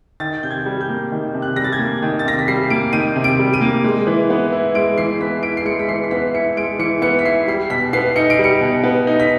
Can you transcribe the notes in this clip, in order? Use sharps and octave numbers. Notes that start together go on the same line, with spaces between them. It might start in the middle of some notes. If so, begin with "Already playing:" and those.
D#3 A6
C3 G6
G#6
G3
G6
A#3
D#3
C3
F#6
G3 A#6
A6
G#6
A#3
D#3
A6
C3 A#6
B6
G3 C7
A#3 D7
D#3 D#7
C3
D7
G3
D#7
A#3
G#3
E3
B3
E4
G#3 D7
E3 C7
B3 B6
E4 D7
C7
G#3 C#7
B6
E3 C7
C7
B3 B6
E4 C#7
G#3 D7
E3 C#7
B3 C#7
B6
E4 C7
G3 C7
B2 B6
B3 C7
D#4 C#7
D7
G3 C#7
B2
B3
D#4
B6